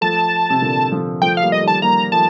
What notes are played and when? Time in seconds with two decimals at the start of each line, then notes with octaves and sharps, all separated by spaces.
0.01 F3 A3 A5
0.50 C3
0.62 A#2 D3
0.92 D3 F3
1.22 F3 A3 G5
1.37 F5
1.42 G3 A#3
1.52 A3 D#5
1.62 D#3 G3
1.68 A5
1.82 G3 A#3 A#5
2.12 F3 A3 A5